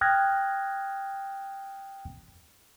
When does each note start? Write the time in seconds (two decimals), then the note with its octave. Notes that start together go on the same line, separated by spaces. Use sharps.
0.01 G5 D#6 F6 F#6 G#6 A#6